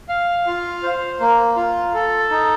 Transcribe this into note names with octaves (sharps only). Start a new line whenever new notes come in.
F5
F4
C5
A#3
F4
A4
D#4